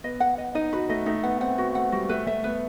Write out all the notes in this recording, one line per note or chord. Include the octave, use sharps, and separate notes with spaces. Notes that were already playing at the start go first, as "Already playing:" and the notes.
B3 D#5
F#5
D#5
D#4 D#5
F#4 B4
A3 D#5
A3 D#4
B3 F#5
C4 F#5
B3 F#4
A3 F#5
G3 F#4
A3 B4
A3 E5
B3 B4